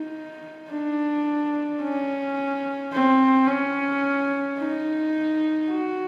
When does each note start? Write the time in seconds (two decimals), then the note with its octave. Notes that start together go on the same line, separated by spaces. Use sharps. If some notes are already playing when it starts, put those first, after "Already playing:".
Already playing: D#4
0.71 D4
1.82 C#4
2.93 C4
3.47 C#4
4.58 D#4
5.69 F#4